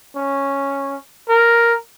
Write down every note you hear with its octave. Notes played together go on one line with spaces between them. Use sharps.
C#4
A#4